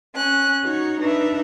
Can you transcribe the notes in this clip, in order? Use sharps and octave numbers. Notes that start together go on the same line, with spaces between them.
C#4 F#6
D#4 F#4 C#5
D4 D#4 B4 E5